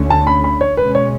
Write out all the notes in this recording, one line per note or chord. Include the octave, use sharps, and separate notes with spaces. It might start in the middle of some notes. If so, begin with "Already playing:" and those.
Already playing: D2 D3 A3 C#4
A5
B5
B5
C#5
B2 G#3 C#4 B4
C#5